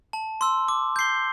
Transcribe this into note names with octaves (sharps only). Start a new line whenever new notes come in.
A5
C6 E6
D6
G6 C7 G7